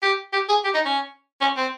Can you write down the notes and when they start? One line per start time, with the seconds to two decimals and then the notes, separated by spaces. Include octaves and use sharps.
0.03 G4
0.33 G4
0.49 G#4
0.64 G4
0.74 D#4
0.85 C#4
1.41 C#4
1.57 C4